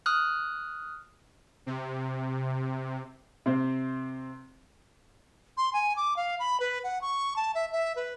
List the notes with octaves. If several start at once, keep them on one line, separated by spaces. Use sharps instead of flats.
D#6 F6 F#6
C3
C3 C4
C6
G#5
D6
F5
B5
B4
F#5
C#6
A5
E5
E5
B4